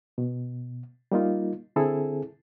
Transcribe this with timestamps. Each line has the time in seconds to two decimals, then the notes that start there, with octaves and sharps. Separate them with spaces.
0.18 B2
1.12 G3 A#3 D#4 F4
1.76 D3 C4 E4 G#4 A4